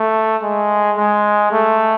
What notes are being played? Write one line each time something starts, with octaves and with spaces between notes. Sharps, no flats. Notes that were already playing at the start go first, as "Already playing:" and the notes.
Already playing: A3
G#3
G#3
A3